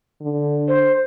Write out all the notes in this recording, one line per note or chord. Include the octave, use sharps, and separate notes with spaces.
D3
C5